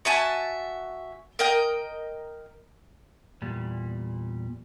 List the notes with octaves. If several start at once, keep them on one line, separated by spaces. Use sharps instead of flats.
F#4 E5 G#5 A5
A#4 D#5 G5
E2 A#2 G3